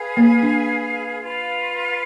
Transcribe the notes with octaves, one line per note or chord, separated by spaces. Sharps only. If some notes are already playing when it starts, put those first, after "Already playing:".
Already playing: G#4 B4 F5 G#5
A#3
D4
F4 B4 F5